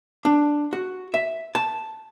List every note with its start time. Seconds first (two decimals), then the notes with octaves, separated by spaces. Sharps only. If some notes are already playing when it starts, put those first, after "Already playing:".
0.25 D4
0.73 F#4
1.14 E5
1.55 A5